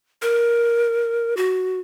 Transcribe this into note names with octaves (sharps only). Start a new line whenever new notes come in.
A#4
F#4